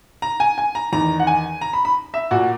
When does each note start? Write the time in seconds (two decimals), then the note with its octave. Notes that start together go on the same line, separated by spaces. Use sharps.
0.22 A#5
0.40 G#5
0.58 G#5
0.75 A#5
0.92 E2 D#3 A#5
1.20 F#5
1.27 G#5
1.61 A#5
1.73 B5
1.85 B5
2.14 E5
2.31 A#2 F#4